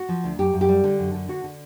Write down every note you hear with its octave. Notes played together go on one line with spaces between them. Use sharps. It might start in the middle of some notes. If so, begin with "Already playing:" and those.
Already playing: F#4
F3
D2
F#2 G4
F#2
G4
G3
D3
F#2
D3
D3 F#4
D3